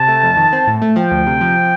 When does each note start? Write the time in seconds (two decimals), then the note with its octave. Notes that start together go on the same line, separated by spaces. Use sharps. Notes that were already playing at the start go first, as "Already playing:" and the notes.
Already playing: C3 A5
0.08 A3
0.23 F2
0.37 D#3
0.53 C4
0.67 A2
0.82 A3
0.96 F3 G5
1.11 D2
1.26 C3
1.41 F3